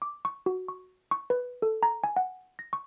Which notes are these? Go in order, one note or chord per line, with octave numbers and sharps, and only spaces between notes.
D6
C#6
F#4
C#6
C#6
B4
A4
A#5
G#5
F#5
A#6
C#6